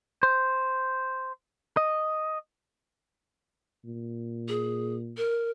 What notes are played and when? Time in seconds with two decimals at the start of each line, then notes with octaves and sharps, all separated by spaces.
0.23 C5
1.77 D#5
3.84 A#2
4.49 G#4
5.17 A#4